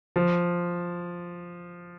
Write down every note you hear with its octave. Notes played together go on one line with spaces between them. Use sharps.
F3